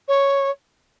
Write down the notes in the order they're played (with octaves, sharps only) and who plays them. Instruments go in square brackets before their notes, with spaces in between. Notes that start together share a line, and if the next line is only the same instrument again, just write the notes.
[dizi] C#5